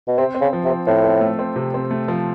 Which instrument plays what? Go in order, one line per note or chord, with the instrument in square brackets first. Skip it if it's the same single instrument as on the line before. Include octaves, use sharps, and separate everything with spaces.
[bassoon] B2
[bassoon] C3 [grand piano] C4
[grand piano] C4
[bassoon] C#3
[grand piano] F3
[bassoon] C3
[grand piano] C4
[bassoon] A2 [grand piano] C4
[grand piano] C4
A3
C4
C3
C4
A3
F3